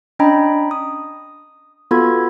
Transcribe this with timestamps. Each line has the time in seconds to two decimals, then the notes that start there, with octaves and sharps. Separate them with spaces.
0.19 C#4 D4 D#5 G5 A#5 B5
0.71 D#6
1.91 B3 F4 F#4 A4 B5 G#6